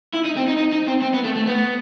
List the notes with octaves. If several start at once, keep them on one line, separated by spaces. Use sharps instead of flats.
E4
D#4
C4
D#4
D#4
D#4
C4
C4
B3
A3
A3
B3